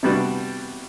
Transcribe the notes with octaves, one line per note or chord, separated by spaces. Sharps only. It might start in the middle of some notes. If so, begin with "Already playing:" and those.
C3 G3 B3 D4 F#4